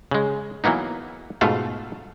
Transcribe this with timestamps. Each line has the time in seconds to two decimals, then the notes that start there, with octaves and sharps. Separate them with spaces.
0.11 C#3 G#3
0.64 E3 F#3 A#3 B3 D#4
1.41 G#2 B2 A3 F4 F5 A5